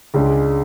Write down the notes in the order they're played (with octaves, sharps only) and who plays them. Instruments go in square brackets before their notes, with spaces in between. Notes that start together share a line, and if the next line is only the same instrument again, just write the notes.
[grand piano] C#2 C#3 G#3 D4